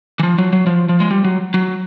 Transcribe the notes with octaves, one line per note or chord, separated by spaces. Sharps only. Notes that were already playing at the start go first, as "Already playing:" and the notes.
E3
F3
F#3
F#3
F3
F3
G#3
G3
F#3
F#3